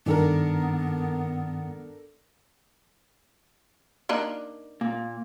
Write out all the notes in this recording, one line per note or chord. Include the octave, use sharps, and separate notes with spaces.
G2 D#3 B3 D4 A4 A#4
A#3 D4 D#4
A#2